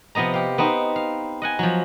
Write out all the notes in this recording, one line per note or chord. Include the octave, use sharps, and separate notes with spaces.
C3 F3 B3 D#5 A#5
G4 F5
B3 C4 D#4
F5
D#5 F#5 G#5
F3 F#3